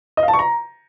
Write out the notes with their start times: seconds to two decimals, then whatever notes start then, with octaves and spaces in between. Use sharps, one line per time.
0.17 D#5
0.23 F5
0.28 A5
0.34 C#6
0.39 A#5